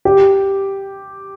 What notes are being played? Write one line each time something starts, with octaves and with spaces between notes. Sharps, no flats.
G4